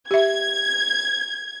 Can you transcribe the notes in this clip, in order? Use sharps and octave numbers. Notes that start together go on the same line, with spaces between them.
G4 E5 G#6